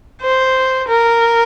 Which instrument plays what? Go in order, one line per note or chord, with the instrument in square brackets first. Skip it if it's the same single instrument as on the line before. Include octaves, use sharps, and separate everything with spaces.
[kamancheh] C5
A#4